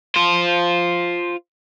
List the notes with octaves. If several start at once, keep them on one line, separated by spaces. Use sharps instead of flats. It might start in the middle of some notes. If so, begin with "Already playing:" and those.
F4 C5